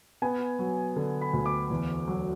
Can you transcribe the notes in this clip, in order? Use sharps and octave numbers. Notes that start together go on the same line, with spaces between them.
B3 G#5
F#3
D3
B5
D2
D6
E2
F#3